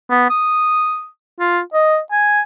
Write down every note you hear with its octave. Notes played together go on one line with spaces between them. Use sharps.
B3
D#6
F4
D#5
G#5